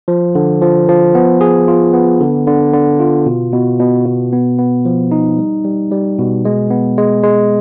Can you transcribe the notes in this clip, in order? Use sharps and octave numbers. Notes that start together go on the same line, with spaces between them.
F3
D3
F3
F3
B3
G#4
F4
B3
D3
D3
D3
F4
B2
B2
B2
B2
B3
B3
F3
D#4
G3
G3
G3
B2
G#3
B3
G#3
G#3